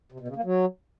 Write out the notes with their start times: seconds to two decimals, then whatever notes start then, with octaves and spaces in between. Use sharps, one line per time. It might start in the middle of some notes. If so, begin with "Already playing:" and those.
0.12 C3
0.20 B2
0.28 C#3
0.36 A#3
0.44 F#3